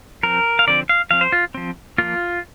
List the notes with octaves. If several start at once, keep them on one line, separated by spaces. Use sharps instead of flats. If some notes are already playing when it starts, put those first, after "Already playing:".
F3 C4 A#4
F5
D3 F3 C4 D5
F5
F3 C4 F5
C5
F4
F3 C4
F3 A#3 F4